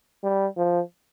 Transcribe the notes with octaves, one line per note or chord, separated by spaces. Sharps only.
G3
F3